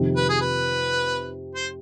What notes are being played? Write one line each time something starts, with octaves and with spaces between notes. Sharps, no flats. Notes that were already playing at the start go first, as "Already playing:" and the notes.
Already playing: F2 C3 D#3
B4
G#4
B4
C5